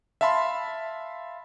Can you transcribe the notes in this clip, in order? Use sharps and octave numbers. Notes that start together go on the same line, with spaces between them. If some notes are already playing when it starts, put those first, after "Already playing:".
E5 F5 A5 B5 C6